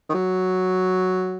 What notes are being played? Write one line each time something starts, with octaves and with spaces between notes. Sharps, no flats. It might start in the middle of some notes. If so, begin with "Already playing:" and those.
D#3
F#3